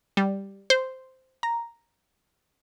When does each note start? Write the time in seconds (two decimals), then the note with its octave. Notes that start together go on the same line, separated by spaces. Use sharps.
0.17 G3
0.70 C5
1.43 A#5